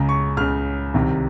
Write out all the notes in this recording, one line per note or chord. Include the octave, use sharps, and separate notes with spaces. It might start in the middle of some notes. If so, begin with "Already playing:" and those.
Already playing: C#2 C#3 A#5
C#6
C#2 C#3 F6
C2 C3 D#3